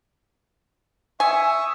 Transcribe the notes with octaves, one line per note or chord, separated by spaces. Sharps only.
E5 G#5 C#6 D#6